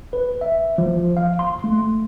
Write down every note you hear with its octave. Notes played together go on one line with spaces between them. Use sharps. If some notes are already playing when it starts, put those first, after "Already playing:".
B4
E5
F3
F5
C6
A3